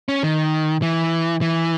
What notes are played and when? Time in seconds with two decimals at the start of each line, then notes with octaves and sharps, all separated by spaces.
0.09 C#4
0.23 D#3
0.82 E3
1.41 E3